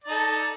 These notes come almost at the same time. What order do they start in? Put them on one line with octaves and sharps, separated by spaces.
D5 D#4 A4